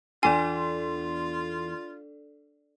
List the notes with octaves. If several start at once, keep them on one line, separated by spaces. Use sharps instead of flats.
E2 D4 F4 A4 D5 G#5 C6